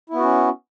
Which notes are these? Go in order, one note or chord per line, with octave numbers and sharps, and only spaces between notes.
B3 C#4 E4 F#4